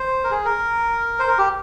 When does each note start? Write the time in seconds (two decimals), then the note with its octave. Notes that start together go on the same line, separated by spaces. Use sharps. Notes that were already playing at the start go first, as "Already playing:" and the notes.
Already playing: C5
0.24 A#4
0.31 G#4
0.45 A#4
1.19 C5
1.28 A#4
1.38 G4